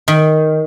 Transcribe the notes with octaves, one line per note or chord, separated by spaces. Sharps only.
D#3